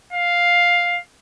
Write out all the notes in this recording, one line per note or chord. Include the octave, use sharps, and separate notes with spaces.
F5